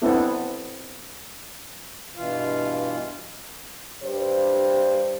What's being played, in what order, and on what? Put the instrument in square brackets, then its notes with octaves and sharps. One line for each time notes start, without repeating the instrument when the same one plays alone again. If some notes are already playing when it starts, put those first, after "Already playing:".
[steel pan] B3 C4 D4 E4 A4
[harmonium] G2 B2 E3 F4 F5
[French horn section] G2 G4 C5